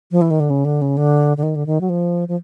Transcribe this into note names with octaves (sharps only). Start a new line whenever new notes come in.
F3
E3
D#3
D3
C#3
D3
C#3
D3
D3
D#3
D3
D#3
F#3
F3
F3